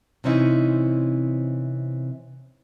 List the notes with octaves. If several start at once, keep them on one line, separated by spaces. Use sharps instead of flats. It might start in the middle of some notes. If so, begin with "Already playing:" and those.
C3 E3 C4 C#4 D#4 E4